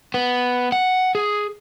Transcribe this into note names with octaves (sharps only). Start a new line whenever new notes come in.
B3
F#5
G#4